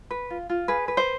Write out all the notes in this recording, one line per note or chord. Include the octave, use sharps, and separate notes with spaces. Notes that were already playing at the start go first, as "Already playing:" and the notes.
B4
F4
F4
G#4 B4
B4
C5